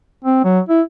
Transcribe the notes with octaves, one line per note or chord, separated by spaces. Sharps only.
C4
F#3
E4